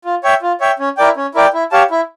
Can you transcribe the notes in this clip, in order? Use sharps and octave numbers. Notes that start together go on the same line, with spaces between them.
F4
C#5 E5 G5
F4
C#5 E5 G5
C#4
E4 A#4 D5 G5
C#4
E4 A#4 D5 G5
E4
G4 C#5 F5 A5
E4